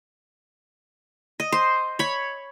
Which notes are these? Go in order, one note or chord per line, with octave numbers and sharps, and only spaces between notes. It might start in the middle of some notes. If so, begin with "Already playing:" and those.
D#5
C5
C#5 B5